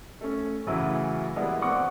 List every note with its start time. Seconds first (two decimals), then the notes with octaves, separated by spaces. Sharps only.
0.21 A3 C#4
0.67 F#2 A2 C#3 E3 F#3 E4
1.36 E3 G3 G#3 A#3 B3 E4
1.62 A#1 C4 F#5 C#6 D6